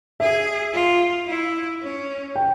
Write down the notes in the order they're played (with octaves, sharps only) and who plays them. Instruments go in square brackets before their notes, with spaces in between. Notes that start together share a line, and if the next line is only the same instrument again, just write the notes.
[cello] G#4 [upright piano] E5
[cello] F4
E4
C#4
[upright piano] G5